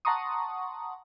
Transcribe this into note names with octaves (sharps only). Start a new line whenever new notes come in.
F#5 A5 A#5 C6 C#6 D#6